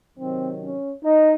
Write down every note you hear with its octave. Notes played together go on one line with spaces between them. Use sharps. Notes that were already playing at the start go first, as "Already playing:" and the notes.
C3 D#3 F#3 C4
C#4
D#4